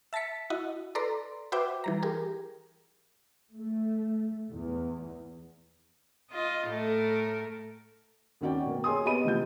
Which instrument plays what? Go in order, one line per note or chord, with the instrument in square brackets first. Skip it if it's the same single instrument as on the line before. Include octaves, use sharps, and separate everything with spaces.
[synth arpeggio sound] E5 A5 A6 B6 C#7
E4 F#4 D#5
A4 B4 D5 A#5 C6
F#4 B4 C5 E5 G5 D6
E3 G3 A#5
G4 G#4 A#4
[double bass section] A3
E2
[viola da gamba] F4 D#5
A2 A3 A#4
[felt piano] D#2 D#3 C#4 F#4 D5 G5
B2 A#3
G#4 C#5 G#5 C6 D#6
B3 G4 D#5 B5 D#7
C3 E3 F3 G6